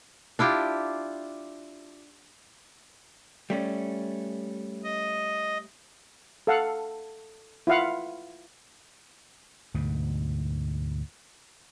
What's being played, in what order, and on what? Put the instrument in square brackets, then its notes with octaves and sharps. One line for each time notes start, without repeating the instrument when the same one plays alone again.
[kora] D4 E4 F4 G4
[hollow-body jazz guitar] G3 A3 C#4
[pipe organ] D#5
[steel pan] A4 F5 F#5
E4 F4 F5 F#5
[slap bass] D2 G#2 B2